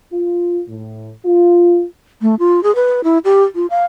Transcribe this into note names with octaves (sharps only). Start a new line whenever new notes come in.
F4
A2
F4
A3
F4
G#4
B4
E4
G4
F4
F5